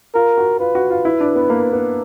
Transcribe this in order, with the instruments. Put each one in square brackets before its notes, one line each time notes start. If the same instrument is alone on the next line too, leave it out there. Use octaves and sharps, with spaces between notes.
[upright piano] F4 [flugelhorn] A#4
[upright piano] F#4
[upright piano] F4 [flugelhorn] B4
[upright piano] F#4
F4
E4
D4
B3
A#3
B3